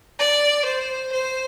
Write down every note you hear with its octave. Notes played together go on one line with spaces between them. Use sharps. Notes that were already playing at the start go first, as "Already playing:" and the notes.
D5
C5
C5